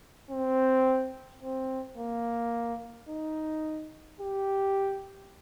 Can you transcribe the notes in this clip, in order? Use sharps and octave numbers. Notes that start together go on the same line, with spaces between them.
C4
C4
A#3
D#4
G4